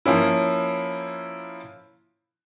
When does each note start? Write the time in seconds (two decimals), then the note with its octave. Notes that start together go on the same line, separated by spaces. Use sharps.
0.06 F3 A#3 C#4 E4